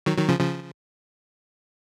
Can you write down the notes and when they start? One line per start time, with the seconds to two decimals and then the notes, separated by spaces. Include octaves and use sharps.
0.06 D#3 F#3
0.17 D#3 F#3
0.29 C#3 F3
0.39 C#3 F3